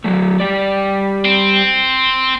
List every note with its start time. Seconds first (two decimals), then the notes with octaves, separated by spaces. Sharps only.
0.04 F#3 A3
0.40 G3 D5
1.25 C4